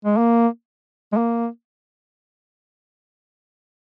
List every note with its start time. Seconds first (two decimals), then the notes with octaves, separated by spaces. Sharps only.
0.05 G#3
0.17 A#3
1.13 G#3
1.17 A#3